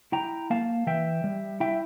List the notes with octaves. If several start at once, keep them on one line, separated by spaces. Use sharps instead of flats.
E4 G5 A#5
A#3 F5 A5
E3 E5 G5
G3
E4 E5 G5